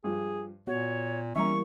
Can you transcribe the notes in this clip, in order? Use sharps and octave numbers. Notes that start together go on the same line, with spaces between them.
G2 F3 G#4
A#2 B3 F#4 C#5
E3 G3 A#3 C#4 E5 A#5 C#6